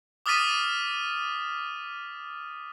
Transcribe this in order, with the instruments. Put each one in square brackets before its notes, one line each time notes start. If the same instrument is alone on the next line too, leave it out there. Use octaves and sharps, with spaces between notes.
[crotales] D6 D#6 F6 A6 B6 D#7